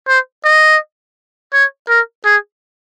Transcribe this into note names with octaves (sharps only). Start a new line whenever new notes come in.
C5
D#5
C#5
A#4
G#4